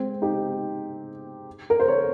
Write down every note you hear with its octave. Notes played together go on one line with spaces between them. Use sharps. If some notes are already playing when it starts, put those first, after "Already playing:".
Already playing: G#3 C4
D#4 G4
A#4
C5
A#4 C#5